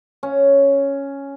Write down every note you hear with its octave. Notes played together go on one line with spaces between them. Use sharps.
C#4